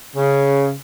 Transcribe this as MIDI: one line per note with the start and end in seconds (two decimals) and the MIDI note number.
0.16 0.75 49